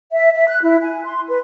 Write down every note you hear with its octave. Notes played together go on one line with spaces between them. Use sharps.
E5
E5
F#6
E4
G#5
C6
B4